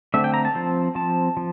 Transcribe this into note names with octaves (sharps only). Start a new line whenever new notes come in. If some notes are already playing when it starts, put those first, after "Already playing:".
D3 A3 C4 E5
G5
A#5
A5
F3 C4
F3 C4 A5
F3